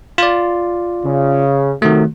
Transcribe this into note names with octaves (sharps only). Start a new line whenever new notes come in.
F4 D5
C#3
C3 D#3 F#3 A3